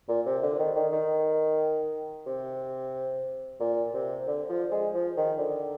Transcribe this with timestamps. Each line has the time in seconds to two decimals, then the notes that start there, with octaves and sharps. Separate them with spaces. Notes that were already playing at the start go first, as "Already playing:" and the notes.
0.09 A#2
0.26 C3
0.42 D3
0.59 D#3
0.76 D#3
0.92 D#3
2.27 C3
3.60 A#2
3.94 C3
4.27 D3
4.50 F3
4.71 G#3
4.94 F3
5.17 D#3
5.39 D3